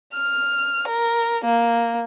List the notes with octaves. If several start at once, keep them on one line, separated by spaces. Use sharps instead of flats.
F6
A#4
A#3